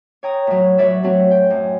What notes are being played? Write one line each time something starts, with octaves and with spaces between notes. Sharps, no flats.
C#5 G5 A#5 D#6
A2 F#3
F#3 B4 C#5 D5 E5
F#3 A3 C4 F#4
G5
F#2